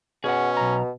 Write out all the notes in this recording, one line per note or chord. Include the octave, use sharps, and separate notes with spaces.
B2 C#4 G#4 F#5
B1 A#5